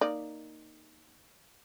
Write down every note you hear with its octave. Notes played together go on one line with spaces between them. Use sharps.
A#3 D#4 D5